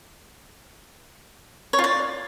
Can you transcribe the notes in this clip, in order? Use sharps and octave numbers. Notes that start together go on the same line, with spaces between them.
C#5
F4
D5